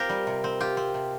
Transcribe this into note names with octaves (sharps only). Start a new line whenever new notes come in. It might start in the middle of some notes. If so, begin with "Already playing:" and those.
Already playing: C4 F4 G4 A#4 C5
G3
C3
C4
F4 G4
C4
C3